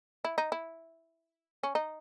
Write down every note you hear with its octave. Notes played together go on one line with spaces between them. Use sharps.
E4
D#4
E4
C#4
D#4